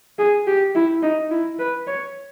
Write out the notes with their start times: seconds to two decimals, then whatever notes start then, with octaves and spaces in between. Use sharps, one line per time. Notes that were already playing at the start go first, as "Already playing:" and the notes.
0.19 G#4
0.47 G4
0.75 E4
1.03 D#4
1.31 E4
1.59 B4
1.87 C#5